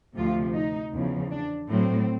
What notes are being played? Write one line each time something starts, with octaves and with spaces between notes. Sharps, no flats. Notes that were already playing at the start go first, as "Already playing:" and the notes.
D2 C3 F3 F4
D#4
E2 C#3 F3
D4
A2 F#3 C4